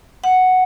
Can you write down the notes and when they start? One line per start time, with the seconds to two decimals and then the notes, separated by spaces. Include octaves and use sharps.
0.24 F#5